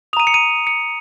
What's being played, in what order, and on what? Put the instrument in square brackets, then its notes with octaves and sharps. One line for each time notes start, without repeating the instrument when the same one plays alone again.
[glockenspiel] D#6 F7
A#5 D#7
C#7
D#7
C#7